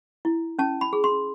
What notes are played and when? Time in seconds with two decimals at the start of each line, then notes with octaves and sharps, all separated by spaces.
0.25 E4
0.59 C#4 A5
0.81 B5
0.93 G#4
1.04 C6